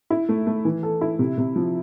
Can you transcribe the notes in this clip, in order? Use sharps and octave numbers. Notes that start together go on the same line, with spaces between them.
E4
A3
A3
E3
A4
E4
C3
C3
F3